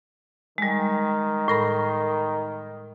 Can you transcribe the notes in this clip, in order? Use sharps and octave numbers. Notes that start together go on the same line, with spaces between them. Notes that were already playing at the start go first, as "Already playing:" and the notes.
D#3 G3 G#3
A2 A#4 B5